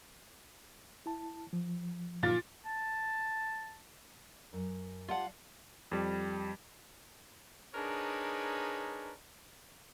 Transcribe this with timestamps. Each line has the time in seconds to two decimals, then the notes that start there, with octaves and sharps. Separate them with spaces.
1.06 E4 A5
1.53 F3
2.23 A#2 F4 A6
2.66 A5
4.53 F#2
5.08 G3 F4 D5 F#5 A5
5.92 F2 G3
7.75 D4 D#4 G#4 A#4 B4 C#5